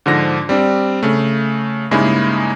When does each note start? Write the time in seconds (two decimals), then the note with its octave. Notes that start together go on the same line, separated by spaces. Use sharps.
0.06 G#2 D3 F3 A#6
0.49 G3 C4 D4
1.03 C#3 A3
1.91 G2 C#3 G#3 A#3 D#4 E4